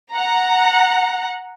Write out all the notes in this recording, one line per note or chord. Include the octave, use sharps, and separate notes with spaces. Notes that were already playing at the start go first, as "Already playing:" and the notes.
F#5 A#5